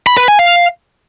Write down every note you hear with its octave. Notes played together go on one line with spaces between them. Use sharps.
B5
B4
G#5
F5